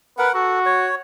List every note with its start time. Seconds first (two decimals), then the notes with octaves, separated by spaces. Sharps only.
0.18 A#4 B4 F#5
0.34 F#4 A4
0.66 C#5